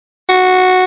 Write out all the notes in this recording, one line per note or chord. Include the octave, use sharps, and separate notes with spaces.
F#4